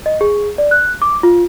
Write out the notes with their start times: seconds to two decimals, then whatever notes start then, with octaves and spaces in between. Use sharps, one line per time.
0.06 D#5
0.21 G#4
0.58 D5
0.71 F#6
1.02 D6
1.23 F4